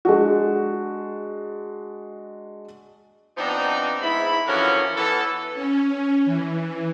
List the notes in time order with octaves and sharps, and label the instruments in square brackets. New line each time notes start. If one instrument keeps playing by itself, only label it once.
[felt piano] G#3 D4 F#4
[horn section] F3 B3 C4 D4 D#4
G#2 E4 B5
D3 E3 F3 C#4 F#4 A#4
E3 B3 A4
[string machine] C#4
E3